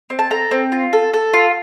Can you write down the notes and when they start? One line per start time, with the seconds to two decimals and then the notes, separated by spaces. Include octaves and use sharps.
0.10 C4
0.19 A5
0.31 A4 A#5
0.51 C4
0.72 F4
0.93 A4
1.14 A4
1.34 F4